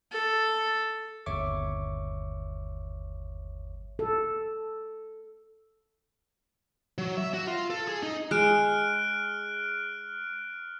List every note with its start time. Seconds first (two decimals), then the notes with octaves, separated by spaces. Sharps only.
0.12 A4
1.26 G1 D#2 C#5 E5 C#6 D6
3.99 A4
6.98 F#3
7.17 E5
7.34 F#4
7.47 F4
7.70 A4
7.88 G#4
8.03 D#4
8.31 G#3 F6 F#6 D7